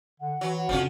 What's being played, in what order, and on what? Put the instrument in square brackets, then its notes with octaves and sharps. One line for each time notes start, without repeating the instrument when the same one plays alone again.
[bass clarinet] D3 [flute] F#5
[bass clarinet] E3 [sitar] F#3
[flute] F#5
[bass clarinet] F2 [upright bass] C#3 D4 [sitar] F3 C#4